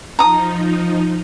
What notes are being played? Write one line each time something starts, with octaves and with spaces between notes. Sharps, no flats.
F3 D#4 A#5 D#6